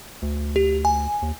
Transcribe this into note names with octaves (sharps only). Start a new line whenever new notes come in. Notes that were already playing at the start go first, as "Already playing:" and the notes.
D2
G4
G#5
D#2